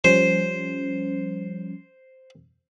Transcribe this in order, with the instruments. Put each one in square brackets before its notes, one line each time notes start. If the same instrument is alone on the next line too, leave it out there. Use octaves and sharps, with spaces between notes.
[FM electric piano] F3 G3 C#4 [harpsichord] C5